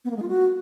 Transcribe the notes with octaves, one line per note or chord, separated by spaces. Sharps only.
B3
A#3
G#3
F4
F#4